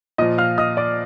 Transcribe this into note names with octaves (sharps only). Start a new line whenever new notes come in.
A#2 F3 D#5 D#6
F5 F6
D#5 D#6
D5 D6